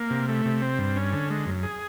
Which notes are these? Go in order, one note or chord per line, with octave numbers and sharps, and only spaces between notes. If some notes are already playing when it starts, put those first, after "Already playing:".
Already playing: A#3
C3
A3
C3
C4
G2
C#4
D3
G#3
F#2
G#4